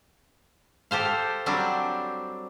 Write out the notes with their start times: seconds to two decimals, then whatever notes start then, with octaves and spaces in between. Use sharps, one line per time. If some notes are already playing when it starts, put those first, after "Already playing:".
0.91 G4 A4 C5 F5
1.46 F#3 G3 C4 D4 G4